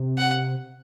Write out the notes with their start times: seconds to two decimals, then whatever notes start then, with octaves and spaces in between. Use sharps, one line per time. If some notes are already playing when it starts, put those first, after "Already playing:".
Already playing: C3
0.18 F#5